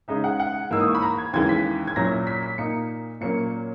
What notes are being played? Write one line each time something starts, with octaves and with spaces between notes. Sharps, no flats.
C#3 G#3 D#4 E5
F#5
F#5
G#2 E3 A#3 D#4 E6
D#6
C#6
B5
A#5
G#6
D#2 C#3 E3 G#3 G#6
B6
G#6
A#2 F#3 C#4 E4 A#6
B6
B6
A#2 A#3 D#4 C#7
A#2 F#3 A#3 C#4 C#7